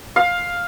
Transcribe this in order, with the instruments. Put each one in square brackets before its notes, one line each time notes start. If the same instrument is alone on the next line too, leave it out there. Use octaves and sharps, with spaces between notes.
[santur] F5